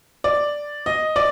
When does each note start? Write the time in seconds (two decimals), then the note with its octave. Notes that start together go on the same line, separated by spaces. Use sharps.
0.24 D5
0.86 D#5
1.16 D5